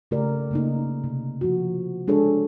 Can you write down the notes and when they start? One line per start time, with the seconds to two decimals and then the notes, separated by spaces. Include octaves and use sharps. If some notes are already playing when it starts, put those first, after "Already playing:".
0.11 C#3 A3 G4 A#4 D5
0.51 C#3 A#3 D#4
1.04 C3
1.41 F3 F#4
2.08 G#3 D4 G#4 A4 C#5